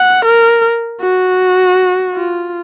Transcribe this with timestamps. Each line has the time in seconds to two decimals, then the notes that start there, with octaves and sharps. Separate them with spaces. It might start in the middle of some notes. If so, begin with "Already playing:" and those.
Already playing: F#5
0.25 A#4
1.01 F#4
2.15 F4